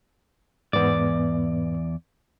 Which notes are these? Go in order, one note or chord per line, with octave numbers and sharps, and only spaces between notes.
E2 G#2 B3 D5